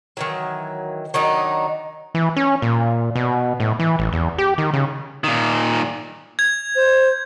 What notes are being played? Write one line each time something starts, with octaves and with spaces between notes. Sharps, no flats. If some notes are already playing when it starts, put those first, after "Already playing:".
D#3 E3 F#3
D#3 F#3 D4 D#4
E3
C#4
A#2
B2
A2
E3
A1
E2
G4
D#3
C#3
A#2 D#3
G#6
C5